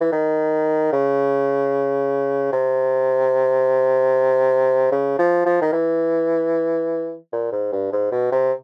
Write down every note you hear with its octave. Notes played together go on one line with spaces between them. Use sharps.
E3
D#3
C#3
C3
C#3
F3
F3
D#3
E3
A#2
G#2
G2
G#2
B2
C3